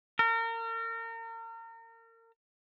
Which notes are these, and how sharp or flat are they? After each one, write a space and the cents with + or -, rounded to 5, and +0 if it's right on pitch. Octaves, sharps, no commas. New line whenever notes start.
A#4 -35